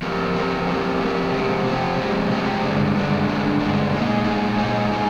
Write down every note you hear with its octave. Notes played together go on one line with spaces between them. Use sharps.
F3 C4 G4 A#4
F3 C4 G4 A#4
F3 C4 G4 A#4
F3 C4 G4 A#4
C3 F3 G#3 C4 G4
C3 F3 G#3 C4 G4
C3 F3 G#3 C4 G4
C3 F3 G#3 C4 G4
G2 D3 G#3 D4
G2 D3 G#3 D4
G2 D3 G#3 D4
G2 D3 G#3 D4
A#2 G#3 D#4 G#4
A#2 G#3 D#4 G#4
A#2 G#3 D#4 G#4
A#2 G#3 D#4 G#4